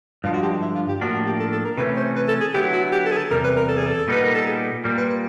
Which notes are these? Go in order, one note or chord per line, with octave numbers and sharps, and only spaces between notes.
G2 D3 F3 G#3 F4
F#4
G4
E4
F4
G4
A2 F3 A#3 D4 F#4
F#4
G4
A4
A4
A#4
C3 E3 A3 C#4 B4
C5
B4
A4
G#4
D3 F#3 B3 E4 G4
F#4
G4
A4
G#4
A4
E2 C3 G3 A#4
B4
A#4
A4
G#4
A4
A#2 G3 B3 D#4 B4
A#4
A4
G#4
A#2 G3 A#3 A#4
B4
B4